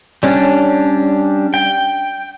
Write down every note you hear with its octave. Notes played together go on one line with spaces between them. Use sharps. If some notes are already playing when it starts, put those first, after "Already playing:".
G3 C#4 D4
G5